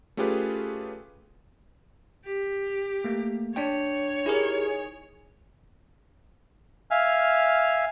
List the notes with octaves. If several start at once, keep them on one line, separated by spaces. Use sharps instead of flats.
A3 C#4 F4 G4 G#4 B4
G4
A3 A#3
D4 C#5 D5 G5
D#4 E4 G4 G#4 A#4
E5 F5 G#5 F6